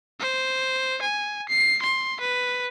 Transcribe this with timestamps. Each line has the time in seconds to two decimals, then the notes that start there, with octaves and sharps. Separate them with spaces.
0.20 C5
1.02 G#5
1.49 C7
1.82 C6
2.20 B4